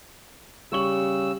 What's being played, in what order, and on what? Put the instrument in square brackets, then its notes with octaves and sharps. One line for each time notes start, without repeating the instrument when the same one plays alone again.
[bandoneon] C#3 E6 [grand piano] G3 C#6 F#7